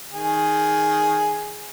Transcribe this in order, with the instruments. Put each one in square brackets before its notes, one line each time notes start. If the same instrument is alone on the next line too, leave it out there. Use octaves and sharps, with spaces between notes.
[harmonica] D#3 G#4